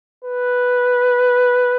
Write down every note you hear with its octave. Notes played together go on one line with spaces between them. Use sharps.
B4